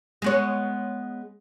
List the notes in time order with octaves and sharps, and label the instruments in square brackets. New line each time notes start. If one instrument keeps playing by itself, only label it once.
[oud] G#3 B3 C#5